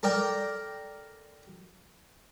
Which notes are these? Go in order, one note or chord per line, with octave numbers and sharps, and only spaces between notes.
A4 A#4 D5 G5